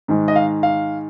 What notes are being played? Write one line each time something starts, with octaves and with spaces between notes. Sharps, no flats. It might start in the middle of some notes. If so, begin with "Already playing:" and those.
G#2 D#3 G#3
D#5
F5
F5